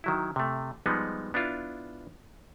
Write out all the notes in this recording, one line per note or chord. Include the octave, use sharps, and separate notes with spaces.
D#3 F#3 E4
C3 A3
F3 G3 G#3 B3 D#4
B3 D4 E4 F4